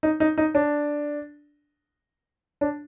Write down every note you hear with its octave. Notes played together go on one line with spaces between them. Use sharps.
D#4
D#4
D#4
D4
D4